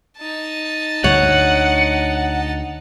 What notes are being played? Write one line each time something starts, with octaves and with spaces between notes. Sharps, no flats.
D#4 A5
D2 C#5 F#5